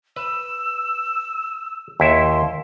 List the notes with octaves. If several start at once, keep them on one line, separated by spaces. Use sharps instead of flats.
B4 E6
D#2 E4 E5 C6